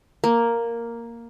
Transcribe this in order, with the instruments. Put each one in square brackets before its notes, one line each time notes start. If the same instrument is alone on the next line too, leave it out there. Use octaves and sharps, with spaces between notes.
[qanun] A#3